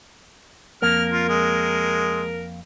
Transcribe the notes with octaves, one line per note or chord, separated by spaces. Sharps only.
F2 A#3 A#4 F6
F4
G#3